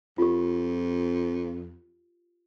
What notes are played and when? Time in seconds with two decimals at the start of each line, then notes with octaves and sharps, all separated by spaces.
0.18 F2 F4 G4